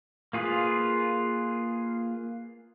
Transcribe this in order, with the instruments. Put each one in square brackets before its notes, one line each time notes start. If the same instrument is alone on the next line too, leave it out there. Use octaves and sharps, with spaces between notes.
[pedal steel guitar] A#3 F4 G#4 B4